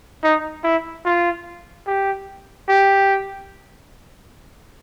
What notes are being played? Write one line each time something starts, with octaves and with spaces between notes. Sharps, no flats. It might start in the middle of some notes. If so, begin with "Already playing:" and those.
D#4
E4
F4
G4
G4